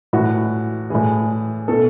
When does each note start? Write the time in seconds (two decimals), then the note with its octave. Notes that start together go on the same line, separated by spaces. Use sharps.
0.13 A2 E3 F#4
0.90 A2 E3 G#4
1.68 B2 A4